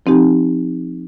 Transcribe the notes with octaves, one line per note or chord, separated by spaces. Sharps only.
F3 C4 D#4 G4